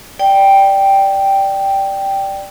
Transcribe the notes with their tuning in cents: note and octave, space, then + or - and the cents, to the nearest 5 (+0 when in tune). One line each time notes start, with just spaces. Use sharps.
D5 +0 G5 +0